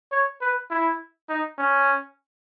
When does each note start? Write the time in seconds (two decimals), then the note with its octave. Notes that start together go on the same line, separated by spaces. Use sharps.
0.12 C#5
0.41 B4
0.70 E4
1.29 D#4
1.58 C#4